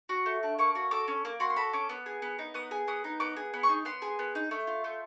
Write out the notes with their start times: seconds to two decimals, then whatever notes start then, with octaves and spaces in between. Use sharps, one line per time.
0.09 F#4
0.26 A3
0.43 D4
0.59 A#3 C#6
0.75 F#4
0.91 A4 D6
1.08 C#4
1.25 A#3
1.40 F#4 C6
1.50 C6
1.56 A4 B5
1.73 C#4 D6
1.89 B3
2.06 G#4
2.22 B3
2.39 D#4
2.54 B3 D#6
2.71 G#4
2.88 B3 D#6
3.04 D#4
3.20 B3 D6
3.37 G#4
3.54 B3
3.63 C#6
3.69 D#4
3.85 B3 C6
4.02 G#4
4.19 B3
4.35 D#4
4.51 A3
4.67 F4
4.84 A3